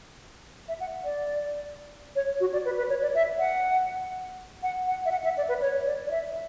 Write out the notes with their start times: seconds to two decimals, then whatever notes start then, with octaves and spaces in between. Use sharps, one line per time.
0.68 E5
0.80 F#5
1.04 D5
2.16 C#5
2.40 F#4
2.53 D5
2.65 B4
2.78 B4
2.89 C#5
3.02 D5
3.15 E5
3.39 F#5
4.63 F#5
4.88 F#5
5.05 E5
5.11 F#5
5.24 E5
5.37 D5
5.49 B4
5.62 C#5
5.86 D5
6.07 D5
6.11 E5